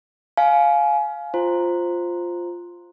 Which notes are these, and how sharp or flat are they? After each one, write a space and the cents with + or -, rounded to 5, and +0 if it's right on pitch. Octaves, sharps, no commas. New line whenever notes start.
F5 +0 G#5 +25
F4 +0 C5 +0 A#5 +0